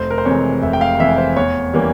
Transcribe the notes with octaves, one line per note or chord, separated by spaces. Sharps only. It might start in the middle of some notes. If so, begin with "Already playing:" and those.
Already playing: F1 C5
A#4
C5
F2 C3 E3 G#3 C#5
F1 E5
G5
F5
F2 C3 E3 G#3 E5
C5
E2 C#5
E3 G3 A#3 C#4